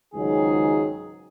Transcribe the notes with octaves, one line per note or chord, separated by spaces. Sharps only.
C#2 G#2 D#3 F#3 G#4